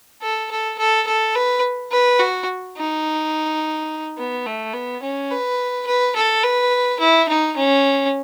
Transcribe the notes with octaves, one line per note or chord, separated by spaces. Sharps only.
A4
A4
A4
A4
B4
B4
F#4
D#4
B3
A3
B3
C#4
B4
B4
A4
B4
E4
D#4
C#4